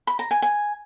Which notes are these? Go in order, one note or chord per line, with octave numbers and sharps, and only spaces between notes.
B5
A#5
G#5
G#5